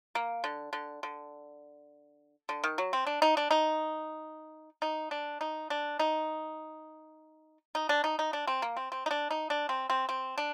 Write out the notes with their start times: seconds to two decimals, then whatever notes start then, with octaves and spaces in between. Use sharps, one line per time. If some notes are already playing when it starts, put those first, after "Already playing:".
0.15 A#3
0.44 D3
0.73 D3
1.03 D3
2.49 D3
2.64 D#3
2.78 F#3
2.93 C4
3.07 D4
3.22 D#4
3.37 D4
3.51 D#4
4.82 D#4
5.11 D4
5.41 D#4
5.70 D4
5.99 D#4
7.75 D#4
7.89 D4
8.04 D#4
8.19 D#4
8.33 D4
8.47 C4
8.62 A#3
8.77 C4
8.92 C4
9.06 D#4
9.11 D4
9.31 D#4
9.50 D4
9.69 C4
9.90 C4
10.09 C4
10.38 D4